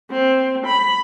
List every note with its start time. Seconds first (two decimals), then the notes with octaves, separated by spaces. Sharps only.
0.11 C4
0.66 B5